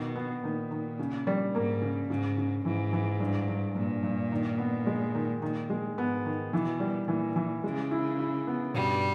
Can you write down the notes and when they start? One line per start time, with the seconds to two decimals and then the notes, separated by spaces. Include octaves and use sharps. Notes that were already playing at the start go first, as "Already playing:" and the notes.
Already playing: B2 D#3
0.15 B3
0.43 A#2 D#3
0.71 D#3
0.99 C#3
1.27 G3
1.54 G#2 A#3
1.82 C#3
2.10 G#2 C#3
2.37 C#3
2.65 G#2 E3
2.92 E3
3.20 G2
3.48 G2
3.75 G2 A#2
4.03 G2
4.32 D#3
4.58 B3
4.87 G#3
5.14 D#3
5.42 A#2 D#3
5.70 G#3
5.98 G#2 B3
6.25 D#3
6.52 B2 E3
6.80 G3
7.08 A#2 E3
7.36 E3
7.64 C#3 G#3
7.91 E4
8.19 E4
8.47 B3
8.74 G2 B2 G3